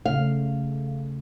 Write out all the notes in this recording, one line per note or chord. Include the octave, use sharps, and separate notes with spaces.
C#3 A3 F5